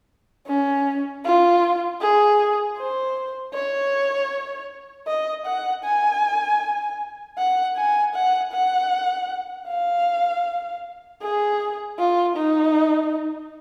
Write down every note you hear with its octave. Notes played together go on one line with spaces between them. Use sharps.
C#4
F4
G#4
C5
C#5
D#5
F#5
G#5
F#5
G#5
F#5
F#5
F5
G#4
F4
D#4